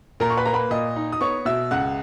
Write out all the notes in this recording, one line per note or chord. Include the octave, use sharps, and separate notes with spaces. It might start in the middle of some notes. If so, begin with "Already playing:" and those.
A#2 A#4 A#5
C#6
B4 B5
A#3 A#5
B4 B5
A#2 D#5 D#6
D#4
D#6
B3 C#5 C#6
B2 E5 E6
C#2 F#5 F#6